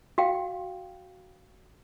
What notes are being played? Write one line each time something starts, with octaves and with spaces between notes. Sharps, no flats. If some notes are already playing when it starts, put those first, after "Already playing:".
F#4 F5 G5